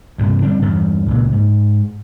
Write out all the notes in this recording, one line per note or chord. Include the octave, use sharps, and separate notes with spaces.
D2 G2 C3
D3 G3 C4 D4
E2 G2
C#2 A#2
G#2